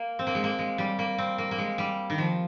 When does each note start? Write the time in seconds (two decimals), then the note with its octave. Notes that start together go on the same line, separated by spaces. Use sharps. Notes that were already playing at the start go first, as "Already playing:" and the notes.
Already playing: A#3
0.19 C4
0.27 A#3
0.35 G#3
0.44 A#3
0.59 G#3
0.78 G3
0.99 A#3
1.18 C4
1.38 A#3
1.51 A#3
1.58 G#3
1.78 G3
2.10 D#3
2.18 F3